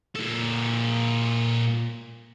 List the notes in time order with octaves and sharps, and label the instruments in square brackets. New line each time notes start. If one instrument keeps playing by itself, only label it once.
[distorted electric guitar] A#2 A4